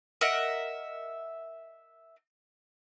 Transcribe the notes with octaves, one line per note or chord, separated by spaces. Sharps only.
A#4 D#5 E5 F#5